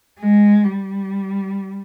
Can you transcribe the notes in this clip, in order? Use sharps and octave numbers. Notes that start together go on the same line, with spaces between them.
G#3
G3